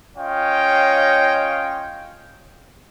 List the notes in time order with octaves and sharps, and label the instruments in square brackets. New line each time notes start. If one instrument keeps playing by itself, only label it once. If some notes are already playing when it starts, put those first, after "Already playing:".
[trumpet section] C#4 F4 C#5 D#5 F5 G5